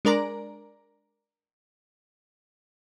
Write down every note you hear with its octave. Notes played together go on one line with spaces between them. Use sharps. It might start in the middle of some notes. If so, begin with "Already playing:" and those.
G#3 D4 A#4 D5 A#5